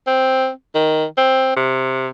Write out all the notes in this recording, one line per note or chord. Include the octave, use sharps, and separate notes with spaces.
C4
D#3
C4
C3